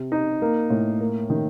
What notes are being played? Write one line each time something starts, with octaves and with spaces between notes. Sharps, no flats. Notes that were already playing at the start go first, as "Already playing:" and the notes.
Already playing: C3
D#4
A#3
A2
A#3
D#3